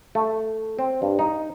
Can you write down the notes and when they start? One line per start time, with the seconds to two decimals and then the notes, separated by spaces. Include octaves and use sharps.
0.15 A3
0.79 C4
1.02 G2
1.19 D#4